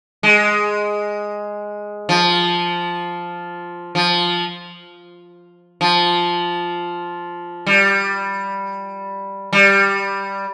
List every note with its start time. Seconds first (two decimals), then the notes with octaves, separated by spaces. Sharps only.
0.23 G#3
2.09 F3
3.95 F3
5.81 F3
7.67 G3
9.53 G3